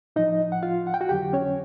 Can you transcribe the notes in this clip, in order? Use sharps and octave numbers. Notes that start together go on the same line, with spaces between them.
A2 F3 D#4 D#5
F#5
F4 F5
F#5
G5
F#4 F#5
F2 D3 F#3 G4 G5
C#4 C#5